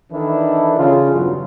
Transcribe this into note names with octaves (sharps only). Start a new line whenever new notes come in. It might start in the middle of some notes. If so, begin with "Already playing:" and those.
D#3 E3 D4 E4 A4
C#3 F4
E2 G2 F#3